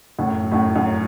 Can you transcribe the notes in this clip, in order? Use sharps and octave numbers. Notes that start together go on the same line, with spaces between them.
F#2 A2
F#2 A2
F#2